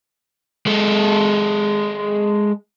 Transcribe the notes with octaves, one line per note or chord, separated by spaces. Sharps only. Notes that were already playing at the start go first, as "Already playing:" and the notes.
G#3 A4